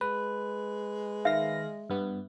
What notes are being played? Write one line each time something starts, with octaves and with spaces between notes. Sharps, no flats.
G#3 B4
D#3 E5 F5 A#6
G2 B3